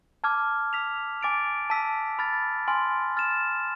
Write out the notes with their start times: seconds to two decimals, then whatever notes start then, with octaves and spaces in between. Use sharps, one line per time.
0.24 A5 D6 F6 G#6
0.73 E6 B6 F7
1.21 G#5 D6 A6 D7 F7
1.70 A5 E6 B6
2.19 B5 F6 A6
2.68 G#5 C6 F6
3.17 F6 A6 E7